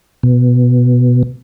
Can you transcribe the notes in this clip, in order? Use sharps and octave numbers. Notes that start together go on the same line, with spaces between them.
B2